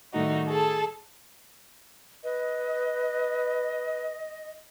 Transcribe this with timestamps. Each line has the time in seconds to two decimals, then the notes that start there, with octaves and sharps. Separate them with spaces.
0.13 A2 D#3 G3 A3 D#4 F#4
0.46 G#4 A4 A5
2.24 B4 D#5